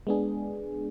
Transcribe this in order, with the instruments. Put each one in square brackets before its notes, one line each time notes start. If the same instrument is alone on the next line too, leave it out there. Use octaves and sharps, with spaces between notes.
[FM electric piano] G#3 B3 D4 G#4